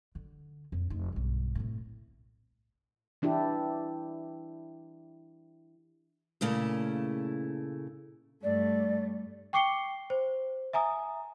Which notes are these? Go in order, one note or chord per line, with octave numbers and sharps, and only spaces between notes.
D3
F2
F1 D#4
B1 G2
A2 C3
E3 D4 E4 G4
A#2 C#3 A3 E4
G2 A3 D5
G5 C#6 D6 C7 C#7 G7
C5
E5 G#5 A#5 D#6